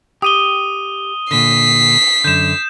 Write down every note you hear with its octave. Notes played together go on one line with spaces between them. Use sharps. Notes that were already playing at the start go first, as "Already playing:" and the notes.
G4 D#6 D#7 G7
A#2 D3 B6 C7
F#2 D3 G6 E7